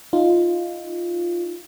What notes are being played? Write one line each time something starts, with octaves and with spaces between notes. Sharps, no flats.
D#4 F4